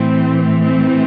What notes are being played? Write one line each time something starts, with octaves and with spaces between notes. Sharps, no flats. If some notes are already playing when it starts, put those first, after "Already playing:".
Already playing: A2 E3 C4
C4